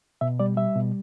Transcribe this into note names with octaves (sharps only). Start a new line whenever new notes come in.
B2 E5
G3 D5
G3 E5
B2